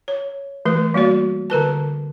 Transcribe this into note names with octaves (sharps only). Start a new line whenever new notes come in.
C#5
E3 A3 B4
G3 A#3 F#4 D5
D3 A#4 B4 A5